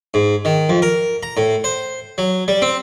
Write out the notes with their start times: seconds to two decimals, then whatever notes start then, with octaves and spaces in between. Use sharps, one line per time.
0.14 G#2
0.45 D#3
0.69 F2
0.82 A#4
1.23 A#5
1.37 A2
1.64 C5
2.18 F#3
2.48 G3
2.62 C4